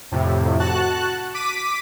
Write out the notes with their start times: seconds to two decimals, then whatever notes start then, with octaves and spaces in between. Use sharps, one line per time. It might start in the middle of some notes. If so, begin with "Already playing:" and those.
0.12 F2 A2 C3
0.60 F#4 A5 F#6
1.34 D6 B6 D#7